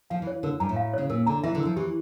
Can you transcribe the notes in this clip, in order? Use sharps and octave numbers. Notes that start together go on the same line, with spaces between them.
F3 F5
E3
C#5
D3 A#4
G2 A#5
A2
F5
C#3 C#5
A#2 A#4
D3 A#5
E3 E5
D3
A#4
F3
E3 G4